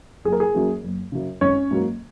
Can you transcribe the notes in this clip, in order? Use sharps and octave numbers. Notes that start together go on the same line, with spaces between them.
F#1 G#4
A#4
G#4
F#2 F#3 A#3
F#1
F#2 C#3
G#1 C#4 C#5
G#2 F#3 A#3